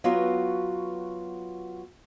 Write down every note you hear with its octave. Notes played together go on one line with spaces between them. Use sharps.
F#3 B3 F4 F#4 B4